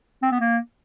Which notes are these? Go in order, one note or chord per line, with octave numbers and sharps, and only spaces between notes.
C4
B3
A#3